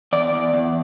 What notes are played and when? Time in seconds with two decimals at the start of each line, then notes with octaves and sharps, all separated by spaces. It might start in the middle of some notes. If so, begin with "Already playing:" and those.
0.13 E2 D5
0.33 E2
0.54 E2